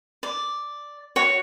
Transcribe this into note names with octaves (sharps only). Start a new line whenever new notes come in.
D5
F#4 C#5